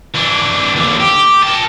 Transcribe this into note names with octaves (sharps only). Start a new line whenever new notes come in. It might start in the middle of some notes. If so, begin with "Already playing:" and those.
E3 D4
D#2 D3
G4
A#4 A5